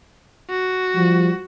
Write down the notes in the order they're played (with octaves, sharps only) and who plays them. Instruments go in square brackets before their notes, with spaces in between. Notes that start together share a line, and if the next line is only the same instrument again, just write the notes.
[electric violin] F#4
[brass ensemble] F3 G3